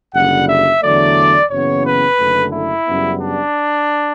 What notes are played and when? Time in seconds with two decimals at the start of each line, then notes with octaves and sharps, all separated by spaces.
0.15 F#1 F#2 D3 G3 F#5
0.49 E5
0.82 E2 D3 F#3 A3 D5
1.51 F#1 F#2 C#3 E3 B3 C#5
1.85 B4
2.19 F#1 F#2 D3 A3
2.53 E4
2.87 F#2 C#3 G3 B3
3.21 D4